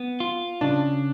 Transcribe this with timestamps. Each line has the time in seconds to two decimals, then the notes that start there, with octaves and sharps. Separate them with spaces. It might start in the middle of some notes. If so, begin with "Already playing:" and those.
Already playing: B3
0.20 F4
0.61 C#3 D4